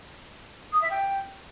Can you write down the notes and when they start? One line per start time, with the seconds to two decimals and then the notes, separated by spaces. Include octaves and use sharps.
0.73 D#6
0.82 E5
0.91 G5